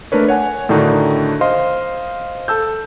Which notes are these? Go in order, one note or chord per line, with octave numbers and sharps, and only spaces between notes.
A3 D4 A#4 B4 C#5
C#5 F#5 G#5
A2 D3 D#3 D4 D#4 F#4
C5 D#5 F5 C6
A4 A5 E6 G6